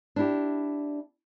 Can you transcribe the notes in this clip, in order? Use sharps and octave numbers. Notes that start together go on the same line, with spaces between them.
D4 E4 G4